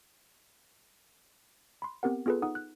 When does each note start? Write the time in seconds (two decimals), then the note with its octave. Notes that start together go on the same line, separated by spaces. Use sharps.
1.82 B5 C6
2.03 B3 C4 G4 A#4 F#5
2.26 B3 F4 G#4 A4 B4
2.42 D#4 F#5 D#6
2.55 F#6